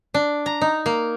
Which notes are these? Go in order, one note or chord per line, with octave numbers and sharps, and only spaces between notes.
D4
A#5
D#4
A#3